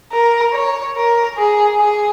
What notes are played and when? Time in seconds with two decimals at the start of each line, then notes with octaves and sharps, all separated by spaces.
0.12 A#4
0.53 C#5
0.96 A#4
1.38 G#4
1.80 G#4